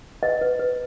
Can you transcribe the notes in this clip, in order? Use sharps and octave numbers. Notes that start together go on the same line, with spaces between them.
B4 D#5
B4
B4